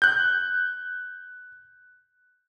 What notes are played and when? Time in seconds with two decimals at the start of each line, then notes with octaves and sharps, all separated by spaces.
0.02 F#6 G6